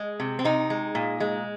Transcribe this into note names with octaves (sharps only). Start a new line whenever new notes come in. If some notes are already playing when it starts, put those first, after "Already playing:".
Already playing: G#3
C3
C4
C3 D#4
G#3
A#2
G#3